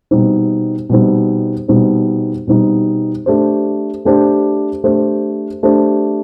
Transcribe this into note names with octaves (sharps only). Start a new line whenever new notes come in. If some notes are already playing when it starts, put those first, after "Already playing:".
B2 G3 C4 D#4
B2 G3 C4 D#4
B2 G3 C4 D#4
B2 G3 C4 D#4
A3 D4 G4 C5
A3 D4 G4 C5
A3 D4 G4 C5
A3 D4 G4 C5